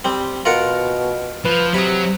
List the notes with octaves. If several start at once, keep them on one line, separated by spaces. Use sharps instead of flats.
G3 C4
B2 F4 A#4 F#5
F3 B4
C3 F#3 B5 D#6